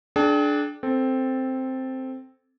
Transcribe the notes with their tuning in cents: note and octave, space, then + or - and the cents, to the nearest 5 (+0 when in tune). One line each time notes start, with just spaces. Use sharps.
D4 +0 G#4 +40 G5 +0
C4 +0 A4 +0